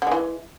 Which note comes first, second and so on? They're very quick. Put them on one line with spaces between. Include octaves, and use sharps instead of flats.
D3 G#3 E3